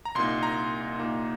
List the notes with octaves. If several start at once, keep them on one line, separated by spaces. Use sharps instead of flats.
A#5
C2 A#2 A#3 D#4 C6
A#5
C2 A#2 A#3 D#4